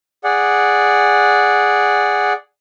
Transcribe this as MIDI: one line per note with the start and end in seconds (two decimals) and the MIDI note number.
0.24 2.33 68
0.24 2.33 74
0.24 2.33 78